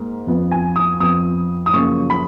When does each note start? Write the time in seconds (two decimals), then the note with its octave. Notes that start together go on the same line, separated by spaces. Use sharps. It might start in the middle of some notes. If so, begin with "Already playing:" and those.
Already playing: G#2 A#3
0.27 F2 F3 B3
0.51 G#5
0.76 D#6
1.00 F2 F3 B3 D#6
1.66 D#6
1.73 F#2 C#3 F3 A#3 C#4 C#6
2.10 B5